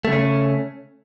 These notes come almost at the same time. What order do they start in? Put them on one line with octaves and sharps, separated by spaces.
A3 C#3 C#4